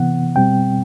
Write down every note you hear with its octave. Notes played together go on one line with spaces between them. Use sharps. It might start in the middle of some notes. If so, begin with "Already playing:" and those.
Already playing: C3 E3 B3 F#5
B2 G3 C4 G5